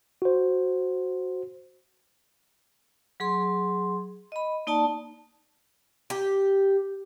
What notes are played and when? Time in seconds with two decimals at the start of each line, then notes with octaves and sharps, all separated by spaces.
0.22 F#4 C5
3.20 F#3 G#4 C6
4.32 D#5 B5
4.67 A#3 D#4 D5 A5
6.10 G4